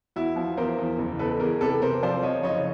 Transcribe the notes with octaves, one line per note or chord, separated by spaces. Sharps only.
E2 E4 F#4
F3
E2 A#4 C5
E2
F#1
E2 A4 B4
E2 G#4 A#4
C3 A4 B4
C3 A#4 C5
F3 C5 D5
F3 C#5 D#5
F#1 C#5 D#5